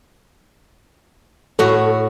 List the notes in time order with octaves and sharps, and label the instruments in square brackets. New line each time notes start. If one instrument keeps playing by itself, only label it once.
[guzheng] A2 F#4 [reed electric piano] A4